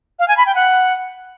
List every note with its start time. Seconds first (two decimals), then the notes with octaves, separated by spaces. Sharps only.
0.19 F5
0.28 G#5
0.37 B5
0.46 G5
0.55 F#5